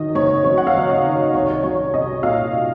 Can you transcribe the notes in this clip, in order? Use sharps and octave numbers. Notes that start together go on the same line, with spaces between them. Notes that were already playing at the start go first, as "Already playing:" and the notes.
Already playing: D#3 F#3 D#5
F#1 C#5
F#2 C#5
F#5
F5
F#3
D#5
D#3
C#5
C2 C#5
F#3 C#5
C2 D#5
A#2 F5